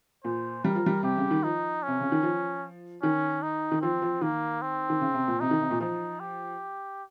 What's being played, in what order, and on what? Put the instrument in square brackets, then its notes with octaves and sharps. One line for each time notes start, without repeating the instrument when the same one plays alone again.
[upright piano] A#2 [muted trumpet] C5
[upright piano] G3 [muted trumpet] A#4
[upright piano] F3
G3
[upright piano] C3 [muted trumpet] G4
[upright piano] C#3
D#3
[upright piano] F3 [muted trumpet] D#4
[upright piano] C3 [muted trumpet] C#4
[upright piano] C#3
D#3
F3
[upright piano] D#3 [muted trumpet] C#4
[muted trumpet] D#4
[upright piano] D#3
[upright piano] F3 [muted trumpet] C4
[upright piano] F3
[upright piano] D#3 [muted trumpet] A#3
[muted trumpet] C4
[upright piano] D#3
C#3
C3
A#2
[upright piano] C3 [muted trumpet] D#4
[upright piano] D#3
C3
A#2
[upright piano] F3 [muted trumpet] D#4
[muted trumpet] G4